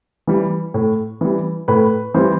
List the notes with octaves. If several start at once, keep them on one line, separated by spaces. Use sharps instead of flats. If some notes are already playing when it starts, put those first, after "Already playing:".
E3 G3
A2
E3 G3
A2 B4
E3 G3 C5